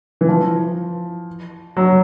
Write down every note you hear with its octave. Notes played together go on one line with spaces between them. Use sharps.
E3
F3
F#3